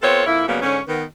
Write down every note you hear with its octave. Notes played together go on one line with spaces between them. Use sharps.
B3 C4 F4 A4 C#5
F2 A#3 E4
C#3 F#3 G3 A#3 B3
G#2 D3 C#4
D#3 B3